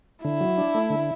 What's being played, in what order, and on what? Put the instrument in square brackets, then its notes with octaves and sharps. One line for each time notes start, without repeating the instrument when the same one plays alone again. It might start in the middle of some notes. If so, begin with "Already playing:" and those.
[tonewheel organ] D3 [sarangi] E4
[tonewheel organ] F#3
D4
A3
D3